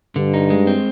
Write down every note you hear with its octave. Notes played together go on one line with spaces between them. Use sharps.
G2 D3
D#4
G#3
C4